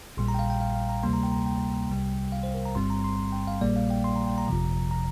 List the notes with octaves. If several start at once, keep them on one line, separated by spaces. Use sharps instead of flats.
A#1 A#2 G3 C6
A#5
G5
F5
G5
F5
F5
A#5
D2 C3 G3 A#3 C6
A#5
G5
A#5
G5
C2 C3 G3
F5
C5
A#4
A#5
G1 G2 G3 C4 C6
A#5
C6
G5
F5
A#1 A#2 G3 A#3 D5
F5
G5
C6
A#5
G5
A#5
G1 F2 C3 F3
A#5